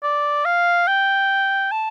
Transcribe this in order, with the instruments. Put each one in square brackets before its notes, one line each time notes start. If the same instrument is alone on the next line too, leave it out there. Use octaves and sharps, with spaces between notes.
[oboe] D5
F5
G5
A5